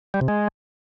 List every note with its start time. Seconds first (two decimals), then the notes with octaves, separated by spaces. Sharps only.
0.14 G3
0.21 C3
0.28 G#3